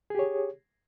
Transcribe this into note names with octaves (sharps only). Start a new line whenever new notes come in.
G4 G#4 C#5